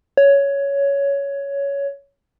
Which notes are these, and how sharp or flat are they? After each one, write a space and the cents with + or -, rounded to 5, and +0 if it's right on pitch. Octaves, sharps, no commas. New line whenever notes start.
C#5 +10